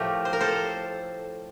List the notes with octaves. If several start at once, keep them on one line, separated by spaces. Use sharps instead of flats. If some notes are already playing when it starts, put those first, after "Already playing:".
Already playing: A2 F3 A3 G4 A#4
C5
A#4
A4 C5